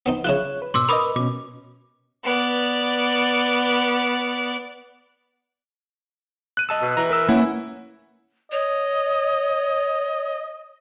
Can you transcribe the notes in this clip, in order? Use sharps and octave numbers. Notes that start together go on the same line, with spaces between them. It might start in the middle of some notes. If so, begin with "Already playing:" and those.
B3 C4 D#4
C#3 E4 F4 C#5 F#6
B4
G#2 B2 C6 D6 E6
A#4 B4 D#5 B5 D6 D#6
B2 C#4 D6
B3 D5
F#6 D#7
D#5 A5 E6
B2
E3 A#5 F#6
A#4 B4 E6
A#3 C#4 E4 F#5
C#5 D#5